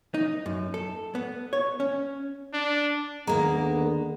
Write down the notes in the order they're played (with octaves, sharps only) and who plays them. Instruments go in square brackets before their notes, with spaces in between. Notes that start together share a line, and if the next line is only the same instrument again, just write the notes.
[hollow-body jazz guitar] D#4
F#2
A4
B3
C#5
C#4
[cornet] D4
[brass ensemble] D#2 D3 B3 [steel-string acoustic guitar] G#3 A#3 [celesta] G#4 A#5